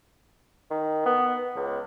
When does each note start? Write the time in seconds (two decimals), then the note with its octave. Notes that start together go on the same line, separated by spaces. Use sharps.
0.70 D#3
1.05 B3
1.56 C#2